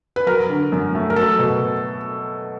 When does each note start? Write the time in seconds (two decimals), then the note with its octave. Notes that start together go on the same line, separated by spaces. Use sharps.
0.16 B4
0.26 F#3 A#4
0.50 D3
0.72 F#2
0.95 A3
1.10 A#4
1.16 F#3 A4
1.39 B2